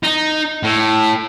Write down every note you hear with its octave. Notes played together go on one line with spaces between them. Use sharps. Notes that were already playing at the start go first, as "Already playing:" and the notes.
D#4
A2